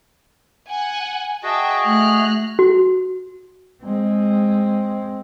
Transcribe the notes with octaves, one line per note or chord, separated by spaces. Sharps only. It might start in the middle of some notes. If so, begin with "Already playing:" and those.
F#5 G#5
F#4 G#4 D#5 E5 G5 A5
A3 F6 F#6
F#4
G#3 C4